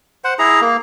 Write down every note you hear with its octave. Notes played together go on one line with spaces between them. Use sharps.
C5 F#5
E4 G#4 A#5
A#3